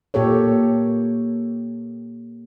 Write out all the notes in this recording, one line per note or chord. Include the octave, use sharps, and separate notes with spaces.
A#2 A#3 G4 A4 C#5